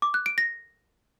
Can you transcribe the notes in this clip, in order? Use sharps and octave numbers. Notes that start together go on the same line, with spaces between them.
D6
F#6
D7
A#6